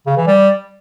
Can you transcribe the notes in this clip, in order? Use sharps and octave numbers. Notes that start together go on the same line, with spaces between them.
C#3
E3
G3